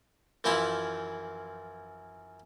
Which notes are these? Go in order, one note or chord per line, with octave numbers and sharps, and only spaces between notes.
F#2 E3 F3 E4 F4 B5